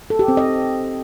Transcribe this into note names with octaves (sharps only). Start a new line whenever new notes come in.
A4
G4
C4
D#5